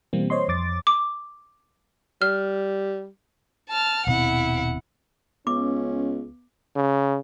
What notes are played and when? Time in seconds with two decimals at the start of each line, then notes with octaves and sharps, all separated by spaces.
0.13 B2 E3 G3 A#3 C4
0.30 C5 C#5 D#5 C6
0.48 F2 D6 A6
0.87 D6
2.22 G3 F6
3.69 A5 F6
4.07 D#1 B2 C4 E4 F#5
5.47 C#2 B3 C#4 D6
6.76 C#3